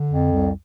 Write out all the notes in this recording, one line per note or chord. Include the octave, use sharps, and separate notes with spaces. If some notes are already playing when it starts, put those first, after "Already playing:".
Already playing: D3
F2
C2